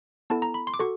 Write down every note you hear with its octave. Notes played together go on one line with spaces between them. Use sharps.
B3 E4 A4 A5
A#5
B5
C6
D6
F#4 A4 C#6